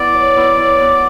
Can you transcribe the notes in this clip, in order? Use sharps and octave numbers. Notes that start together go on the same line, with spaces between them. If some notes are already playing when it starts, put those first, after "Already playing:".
Already playing: B3 E4 D5
F#3
B3 E4
F#3
B3 F#4